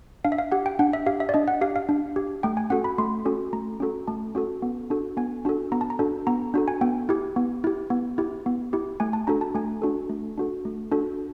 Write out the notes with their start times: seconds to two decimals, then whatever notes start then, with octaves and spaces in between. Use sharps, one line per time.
0.25 D4 F5
0.32 E5
0.38 F5
0.52 G4 F#5
0.66 G5
0.79 D4 F#5
0.93 E5
1.06 G4 F5
1.20 E5
1.29 D5
1.34 D4 D#5
1.48 F#5
1.61 G4 F5
1.76 F5
1.89 D4
2.16 G4
2.43 A3 G5
2.57 G#5
2.70 C#4 F#4 A4 F#5
2.84 B5
2.98 A3 C6
3.25 C#4 F#4 A4
3.53 A3 A#5
3.80 C#4 F#4 A4
4.08 A3 A5
4.35 C#4 F#4 A4
4.62 B3
4.90 D4 F#4 A4
5.17 B3 G#5
5.45 D4 F#4 A4
5.72 B3 A#5
5.81 A5
5.90 A#5
5.99 D4 F#4 A4
6.27 B3 A#5
6.54 D4 F#4 A4
6.68 G#5
6.81 B3 G5
7.09 E4 G4
7.36 B3
7.64 E4 G4
7.90 B3
8.18 E4 G4
8.46 B3
8.73 E4 G4
9.00 A3 G#5
9.13 A5
9.27 D4 F#4 A4 A#5
9.41 A5
9.55 A3 G#5
9.82 D4 F#4 A4
10.10 A3
10.38 D4 F#4 A4
10.65 A3
10.92 D4 F#4 A4